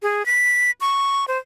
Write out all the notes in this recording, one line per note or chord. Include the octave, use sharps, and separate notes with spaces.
G#4
B6
C#6
C5